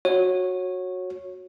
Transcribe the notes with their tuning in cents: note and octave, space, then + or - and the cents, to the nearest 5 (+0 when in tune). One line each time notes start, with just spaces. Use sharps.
F#4 -10 C#5 -15